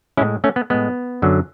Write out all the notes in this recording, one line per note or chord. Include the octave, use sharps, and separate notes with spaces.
A2 G#3 C#4 E4
A3 C#4
B3
A2 G#3 B3
F#2 D3 F#3